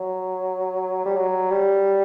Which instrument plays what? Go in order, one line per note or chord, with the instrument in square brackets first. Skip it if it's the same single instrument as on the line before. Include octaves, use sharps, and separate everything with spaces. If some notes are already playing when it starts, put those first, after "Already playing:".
Already playing: [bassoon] F#3
G3
F#3
G3